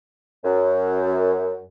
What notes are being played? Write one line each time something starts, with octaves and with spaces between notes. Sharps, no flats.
F#2